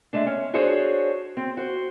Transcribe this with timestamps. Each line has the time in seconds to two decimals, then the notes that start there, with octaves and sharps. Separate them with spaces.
0.13 G#3 A3 D4
0.26 C#4
0.53 D4 F#4 G#4 A4 C5 C#5
1.37 C4
1.57 F#4 C5